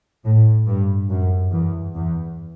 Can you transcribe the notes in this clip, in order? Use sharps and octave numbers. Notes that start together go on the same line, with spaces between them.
A2
G2
F#2
E2
E2